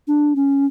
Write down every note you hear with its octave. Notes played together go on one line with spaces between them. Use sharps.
D4
C#4